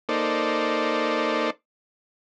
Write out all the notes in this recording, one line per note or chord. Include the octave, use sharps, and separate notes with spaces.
A#3 D#4 A4 C5 D5